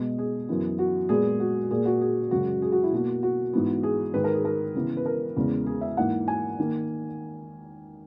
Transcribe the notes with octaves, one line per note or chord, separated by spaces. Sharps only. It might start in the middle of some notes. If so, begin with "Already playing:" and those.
Already playing: B2 G#3 B3 D#5
G#4
F#2 E3 B3
F#4
A#2 G#3 B3 G#4
F#4
A#2 A#3 G#4
F#4
G#4
F#2 C#3 G#3 F#4
G#4
F#4
E4
B2 A#3 F#4
F#4
G#2 E3 B3
G#4
G#2 D#3 G#3 B4
A#4
G#4
A#4
C#3 E3 B3
B4
A#4
E2 C#3 G#3 B3
G#4
E5
G#2 E3 A#3 F#5
G#5
D#3 A#3